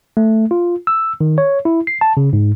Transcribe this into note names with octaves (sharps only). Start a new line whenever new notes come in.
A3
F4
E6
D#3
C#5
E4
C7
A5
C#3
G#2